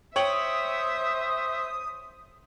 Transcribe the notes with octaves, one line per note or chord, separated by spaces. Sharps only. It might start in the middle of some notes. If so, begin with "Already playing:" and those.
C5 C#5 E5 G5 D#6 F#7